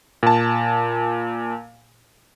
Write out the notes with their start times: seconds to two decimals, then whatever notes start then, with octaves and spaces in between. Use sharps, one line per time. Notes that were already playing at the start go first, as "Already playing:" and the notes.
0.23 A#2 A5